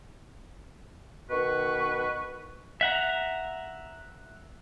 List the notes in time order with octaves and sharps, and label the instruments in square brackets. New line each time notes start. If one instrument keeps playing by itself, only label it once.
[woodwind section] B2 D#3 B4 C#6
[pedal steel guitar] E5 F#5 A#5